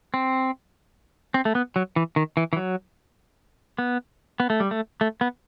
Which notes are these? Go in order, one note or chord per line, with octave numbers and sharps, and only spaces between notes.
C4
C4
A3
B3
F#3
E3
D#3
E3
E3
F#3
B3
B3
A3
G3
A3
A3
B3